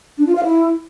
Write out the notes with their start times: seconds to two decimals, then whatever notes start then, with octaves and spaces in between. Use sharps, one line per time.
0.18 D4
0.27 F4
0.35 F5
0.44 E4